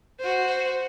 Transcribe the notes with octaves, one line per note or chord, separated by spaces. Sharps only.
F#4 C5